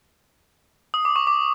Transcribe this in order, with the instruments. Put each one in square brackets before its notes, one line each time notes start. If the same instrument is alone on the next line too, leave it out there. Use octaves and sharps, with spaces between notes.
[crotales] D#6
D6
C#6
D6